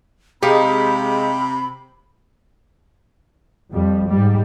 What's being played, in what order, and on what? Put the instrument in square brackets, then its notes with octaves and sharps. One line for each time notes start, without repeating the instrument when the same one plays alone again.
[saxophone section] C3 [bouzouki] G#3 D#4 [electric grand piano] G4 F5 [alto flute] B5
[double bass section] F2 G3
G#2 G3